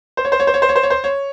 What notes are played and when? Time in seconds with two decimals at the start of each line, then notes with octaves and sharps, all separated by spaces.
0.17 C5
0.25 C#5
0.32 C5
0.40 C#5
0.47 C5
0.54 C#5
0.62 C5
0.69 C#5
0.76 C5
0.83 C#5
0.90 C5
1.04 C#5